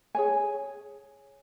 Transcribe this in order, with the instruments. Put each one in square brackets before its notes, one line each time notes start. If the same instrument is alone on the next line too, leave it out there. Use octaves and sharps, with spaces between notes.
[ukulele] G#4 C#5 G#5